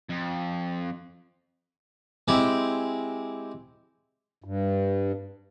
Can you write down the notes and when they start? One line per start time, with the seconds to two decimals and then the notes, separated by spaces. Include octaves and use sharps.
0.09 F2
2.28 G#3 C4 E4 G4
4.44 G2